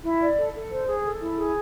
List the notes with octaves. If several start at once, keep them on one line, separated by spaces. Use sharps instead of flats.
E4
D5
A4
A4
C5
G#4
A4
E4
G#4